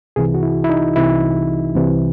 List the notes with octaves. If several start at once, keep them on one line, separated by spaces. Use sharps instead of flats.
C2 C3 E3 G#4
F#4
E4
E4
D#4
C2 C3 E3 E4
C2 C3 E3